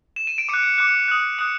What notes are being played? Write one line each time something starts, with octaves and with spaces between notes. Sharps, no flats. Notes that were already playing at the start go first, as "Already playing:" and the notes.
E7
D#7
D7
D6 C#7
F#6
C#7
D6 F#6 C#7
D#6 F#6
D#6 F#6 C#7